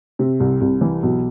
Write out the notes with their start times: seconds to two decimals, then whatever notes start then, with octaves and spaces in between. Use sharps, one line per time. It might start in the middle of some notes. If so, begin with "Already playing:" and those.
0.19 C3
0.40 C2
0.61 C2
0.81 E3
1.03 B1